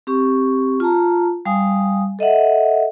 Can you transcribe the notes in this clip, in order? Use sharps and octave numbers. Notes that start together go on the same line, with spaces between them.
C4 G4 C#6
F4 A5 A#5
G3 F5 G#5 D#6
A4 D#5 E5 F#5